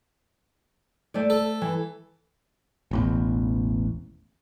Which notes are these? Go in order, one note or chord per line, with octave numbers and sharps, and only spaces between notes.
A3 C5 D5
A4
E3
E1 A1 E2